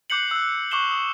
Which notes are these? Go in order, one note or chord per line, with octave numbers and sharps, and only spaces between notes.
D6 F#6 G6 C7 C#7 F#7
E6 F#6
C#6 D6 F#6 C7 E7 G7
D#6